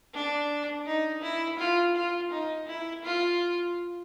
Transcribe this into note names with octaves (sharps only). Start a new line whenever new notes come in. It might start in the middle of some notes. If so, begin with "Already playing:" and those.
D4
D#4
E4
F4
F4
D#4
E4
F4